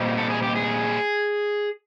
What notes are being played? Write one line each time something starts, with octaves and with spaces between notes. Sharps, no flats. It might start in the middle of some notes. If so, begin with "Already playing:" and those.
Already playing: A#2 G3 C4 D#4
A4
G#4
G4
G#4